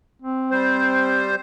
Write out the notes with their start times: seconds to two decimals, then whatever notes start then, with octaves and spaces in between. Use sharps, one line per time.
0.22 C4
0.51 G3 C5